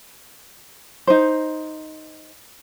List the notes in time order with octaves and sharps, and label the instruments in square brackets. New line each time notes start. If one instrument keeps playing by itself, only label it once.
[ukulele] D#4 C5